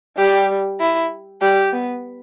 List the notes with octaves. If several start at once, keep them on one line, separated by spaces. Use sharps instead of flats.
G3 G4
E4
G3 G4
B3